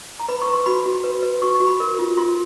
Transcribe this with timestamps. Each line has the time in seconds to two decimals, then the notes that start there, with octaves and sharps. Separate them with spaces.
0.20 A#5
0.28 B4 B5
0.42 C#6
0.48 B4
0.53 C6
0.66 F#4 B5
0.86 F#4
1.04 B4
1.23 B4
1.42 F#4 C#6
1.55 C#6
1.60 F#4
1.67 B5
1.80 A#4
1.99 F4
2.17 F4 C6